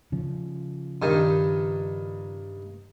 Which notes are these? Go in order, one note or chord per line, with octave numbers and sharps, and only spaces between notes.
C#3 F3
G2 D#3